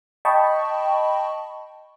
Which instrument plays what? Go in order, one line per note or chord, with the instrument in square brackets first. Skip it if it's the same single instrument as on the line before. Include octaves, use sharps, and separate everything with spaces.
[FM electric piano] D#5 G5 A5 B5 C#6